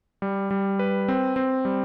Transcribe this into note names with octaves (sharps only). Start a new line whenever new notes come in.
G3
G3
B4
C4
C4
G3